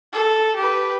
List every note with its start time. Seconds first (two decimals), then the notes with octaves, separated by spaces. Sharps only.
0.13 A4
0.56 G4 B4